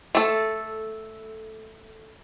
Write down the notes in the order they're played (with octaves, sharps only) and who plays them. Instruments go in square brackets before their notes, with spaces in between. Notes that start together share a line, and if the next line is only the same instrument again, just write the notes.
[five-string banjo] A3 A4